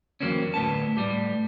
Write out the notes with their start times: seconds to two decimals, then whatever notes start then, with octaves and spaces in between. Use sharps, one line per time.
0.20 F2 E3 F#3 A#3 C4 C#4
0.54 D2 A2 B3 A5
0.97 A2 G3 G4